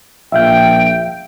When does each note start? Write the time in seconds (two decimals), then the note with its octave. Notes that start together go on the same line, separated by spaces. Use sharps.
0.32 A#1 E5 F5 G5 G6